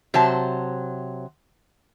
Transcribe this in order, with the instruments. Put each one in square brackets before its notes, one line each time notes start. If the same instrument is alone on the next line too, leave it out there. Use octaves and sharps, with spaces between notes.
[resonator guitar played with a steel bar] C3 F#3 C5 A5